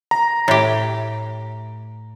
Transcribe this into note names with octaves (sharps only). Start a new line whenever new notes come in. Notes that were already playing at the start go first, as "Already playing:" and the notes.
A#5
A2 G4